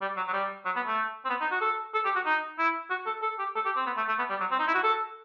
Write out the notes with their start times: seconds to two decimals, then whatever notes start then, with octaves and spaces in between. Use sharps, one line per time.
0.01 G3
0.17 F#3
0.28 F#3
0.33 G3
0.65 F#3
0.76 B3
0.87 A3
1.25 C4
1.30 B3
1.41 D#4
1.51 F#4
1.61 A4
1.94 A4
2.05 G4
2.16 F#4
2.26 D#4
2.58 E4
2.90 F#4
3.06 A4
3.22 A4
3.39 G4
3.55 A4
3.65 G4
3.77 C4
3.86 B3
3.97 A3
4.08 A3
4.19 B3
4.29 G3
4.40 F#3
4.51 C4
4.59 D#4
4.67 E4
4.75 F#4
4.83 A4